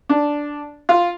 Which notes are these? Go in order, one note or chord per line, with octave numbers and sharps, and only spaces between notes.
D4
F4